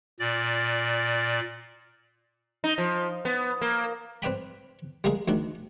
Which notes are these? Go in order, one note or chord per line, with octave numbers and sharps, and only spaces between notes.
A#2 D5
D#4
F3
B3
A#3
C4 B4 D5 G5 B5
G3 G#3 A#3 G#4
D2 D#3 D4